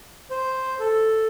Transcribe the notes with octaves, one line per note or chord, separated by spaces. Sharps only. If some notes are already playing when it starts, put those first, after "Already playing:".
C5
A4